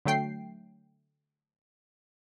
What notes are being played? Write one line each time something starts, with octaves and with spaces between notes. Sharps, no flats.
D3 F#3 A3 G5 C7